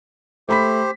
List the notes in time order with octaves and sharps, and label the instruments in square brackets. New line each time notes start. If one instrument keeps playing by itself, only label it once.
[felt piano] A3 B5 B6 [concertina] G4 C5